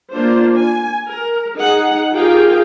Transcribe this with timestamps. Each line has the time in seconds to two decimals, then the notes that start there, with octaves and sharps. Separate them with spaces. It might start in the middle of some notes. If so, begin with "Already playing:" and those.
0.13 A#3 D4 F4 C5
0.56 G#5
1.08 A#4
1.55 D#4 G#4 F#5
2.13 F4 G4 G#4 A#4 F5 G5